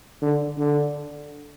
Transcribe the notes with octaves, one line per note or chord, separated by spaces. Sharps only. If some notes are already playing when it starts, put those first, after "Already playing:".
D3
D3